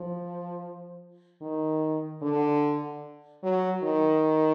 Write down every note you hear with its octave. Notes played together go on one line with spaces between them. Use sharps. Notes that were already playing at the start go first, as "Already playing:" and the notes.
Already playing: F3
D#3
D3
F#3
D#3